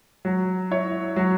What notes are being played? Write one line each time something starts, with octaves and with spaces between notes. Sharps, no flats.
F#3
E4 C#5
F#3